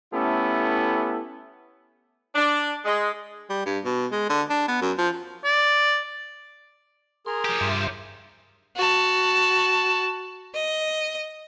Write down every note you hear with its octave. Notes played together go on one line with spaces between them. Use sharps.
A3 B3 C#4 E4 G4 A4
D4
G#3
G3
G2
B2
G#3
D3
D4
B3
F#2
F3
D5
G#4 A#4 C6
F3 G4
G2 E5 C6
F#4 A5
D#5